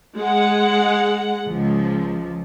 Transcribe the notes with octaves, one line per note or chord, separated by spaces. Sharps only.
G#3 F#5
C#2 F3